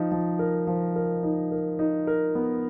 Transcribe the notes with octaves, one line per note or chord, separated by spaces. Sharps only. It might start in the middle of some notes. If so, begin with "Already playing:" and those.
Already playing: F3 D#4
F3
A#4
F3
A#4
D#4
A#4
D#4
A#4
B3